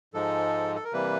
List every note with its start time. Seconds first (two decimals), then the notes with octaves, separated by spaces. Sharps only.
0.14 G#2 F3 G#3 A4
0.76 A4
0.85 A#4
0.93 C3 E3 G3 A#3 B4